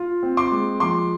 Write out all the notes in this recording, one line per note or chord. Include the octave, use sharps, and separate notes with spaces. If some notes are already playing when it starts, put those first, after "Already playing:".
Already playing: F4
C4
C6 D6
G#3
F3 C6 D6